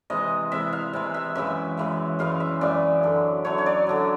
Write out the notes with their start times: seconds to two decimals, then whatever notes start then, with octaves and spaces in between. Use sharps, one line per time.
0.10 C3 E3 G#3 D#5
0.52 C3 E3 G#3 E5
0.73 F5
0.93 C3 E3 G#3 E5
1.14 E5
1.35 F#2 C#3 E3 G#3 E5
1.77 F#2 C#3 E3 G#3
2.19 F#2 C#3 E3 G#3 F5
2.40 E5
2.61 F#2 C#3 E3 G#3 D5
3.03 F#2 D3 F#3
3.45 F#2 D3 F#3 C#5
3.58 C#5
3.66 D5
3.87 F#2 D3 F#3